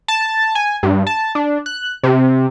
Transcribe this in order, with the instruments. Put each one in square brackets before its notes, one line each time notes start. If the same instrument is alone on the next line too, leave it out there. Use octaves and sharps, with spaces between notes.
[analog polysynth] A5
G#5
G2
A5
D4
F#6
C3